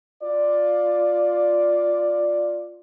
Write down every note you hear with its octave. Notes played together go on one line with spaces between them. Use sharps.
F4 D5